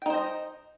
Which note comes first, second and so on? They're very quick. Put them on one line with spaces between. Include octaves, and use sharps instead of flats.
G5 D#4 C5 D#5